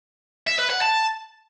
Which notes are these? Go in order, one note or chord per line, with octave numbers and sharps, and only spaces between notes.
E5
B4
F#5
A5